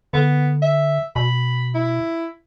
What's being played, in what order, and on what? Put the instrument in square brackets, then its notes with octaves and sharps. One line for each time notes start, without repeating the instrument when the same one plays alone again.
[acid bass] D3 [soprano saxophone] B3
[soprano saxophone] E5
[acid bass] B2 [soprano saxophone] B5
[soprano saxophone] E4